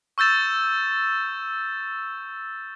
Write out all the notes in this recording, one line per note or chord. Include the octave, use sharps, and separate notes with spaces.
C#6 E6 G6 A6 E7